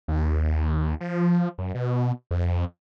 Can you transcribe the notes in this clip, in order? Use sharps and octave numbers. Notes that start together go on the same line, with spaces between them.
D#2
F3
F#2
B2
F2